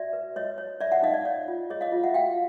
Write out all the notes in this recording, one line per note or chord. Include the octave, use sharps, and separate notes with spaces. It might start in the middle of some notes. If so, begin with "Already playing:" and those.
Already playing: F#4 D5 E5
B4
C#5 D#5
C#5
C#5 D5 E5
E5 F#5
D#4 D#5 F5
D5
C#5 D5
F4
G#4 C#5 D#5
D#5 F5
F4
E5 F#5
F#4 F5 G5